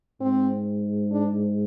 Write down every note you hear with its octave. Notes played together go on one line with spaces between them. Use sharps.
G#2 C4
D4